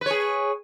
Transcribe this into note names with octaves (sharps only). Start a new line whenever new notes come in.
G#4 B4 C#5